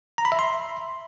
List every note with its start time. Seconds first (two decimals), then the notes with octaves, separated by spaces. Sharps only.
0.18 A#5
0.25 B5
0.32 E5
0.39 C6